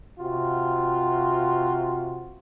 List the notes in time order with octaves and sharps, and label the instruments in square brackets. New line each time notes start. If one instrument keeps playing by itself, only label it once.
[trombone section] C3 F4 F#4